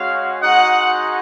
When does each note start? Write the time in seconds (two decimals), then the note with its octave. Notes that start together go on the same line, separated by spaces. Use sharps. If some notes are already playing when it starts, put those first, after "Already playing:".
Already playing: G#3 C#4 F#4 C#5 F5
0.41 G#3 D#4 F#4 D#5 F#5